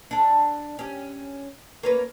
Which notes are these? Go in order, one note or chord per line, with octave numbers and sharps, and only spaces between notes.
D4 A4
C#4 G4
A#3 C#4 B4